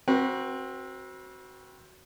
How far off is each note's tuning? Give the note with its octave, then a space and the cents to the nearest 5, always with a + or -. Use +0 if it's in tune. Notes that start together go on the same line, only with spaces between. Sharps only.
C4 +15 F#4 +10 B4 -35